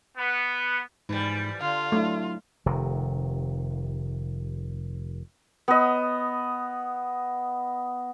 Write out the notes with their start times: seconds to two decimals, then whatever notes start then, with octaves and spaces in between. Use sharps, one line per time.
0.17 B3
1.09 G#2 E3 F3 G3
1.61 D3 F4 F5
1.92 F#3 A3 D4 E4
2.66 F1 C3 D#3
5.68 B3 D#5